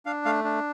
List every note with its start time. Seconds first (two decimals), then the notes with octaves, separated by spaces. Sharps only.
0.06 D4 F5
0.25 A3 F5
0.44 D4